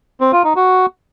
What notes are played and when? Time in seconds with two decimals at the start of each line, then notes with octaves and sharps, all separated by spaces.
0.21 C4
0.32 F4
0.44 D#4
0.56 F#4